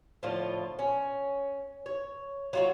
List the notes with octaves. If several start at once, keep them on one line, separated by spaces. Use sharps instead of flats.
A2 D3 F3 F4
C#4
C#5
F#3 F4 F#4